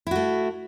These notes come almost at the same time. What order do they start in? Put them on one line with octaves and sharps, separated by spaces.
E4 F#4 A3